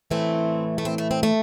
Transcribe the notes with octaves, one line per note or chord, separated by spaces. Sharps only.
A2 E3 A3 C4
A3
C4
A3
C4
A3